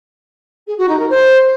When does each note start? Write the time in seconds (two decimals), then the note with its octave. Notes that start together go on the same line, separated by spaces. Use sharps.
0.67 G#4
0.78 F#4
0.88 D#4
0.99 A#4
1.09 C5